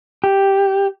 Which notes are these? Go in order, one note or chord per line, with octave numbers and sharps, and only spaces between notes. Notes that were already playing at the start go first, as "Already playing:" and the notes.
G4